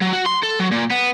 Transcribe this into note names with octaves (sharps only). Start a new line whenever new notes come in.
F#3
F#4
C6
A4
F#3
A#2
B3